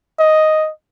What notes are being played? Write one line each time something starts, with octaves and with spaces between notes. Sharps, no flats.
D#5